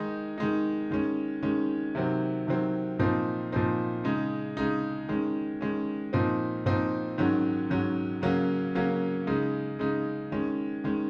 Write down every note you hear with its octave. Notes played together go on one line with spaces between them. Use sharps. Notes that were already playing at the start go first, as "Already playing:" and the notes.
Already playing: D#3 G#3 D#4
D#3 G#3 D#4
D#3 G#3 C#4
D#3 G#3 C#4
C3 D#3 F#3 C4
C3 D#3 F#3 C4
A#2 F3 C4 D#4
A#2 F3 C4 D#4
C#3 G#3 D#4
C#3 G#3 D#4
D#3 G#3 C#4
D#3 G#3 C#4
A#2 F3 C4 D#4
A#2 F3 C4 D#4
G#2 D#3 F#3 C#4
G#2 D#3 F#3 C#4
C#3 F#3 A#3 C#4
C#3 F#3 A#3 C#4
C#3 G#3 D#4
C#3 G#3 D#4
D#3 G#3 C#4
D#3 G#3 C#4